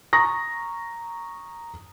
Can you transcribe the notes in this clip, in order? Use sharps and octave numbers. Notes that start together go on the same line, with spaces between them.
A#5 C#6 D#6 A#6